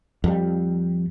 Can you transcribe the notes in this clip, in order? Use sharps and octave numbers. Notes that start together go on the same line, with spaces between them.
F2 G3